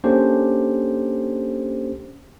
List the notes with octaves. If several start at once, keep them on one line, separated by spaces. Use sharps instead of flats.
A#3 C#4 D4 G4 A4 C5